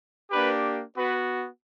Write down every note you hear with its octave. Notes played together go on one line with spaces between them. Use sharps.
A#3 D4 G4 B4
B3 F#4 B4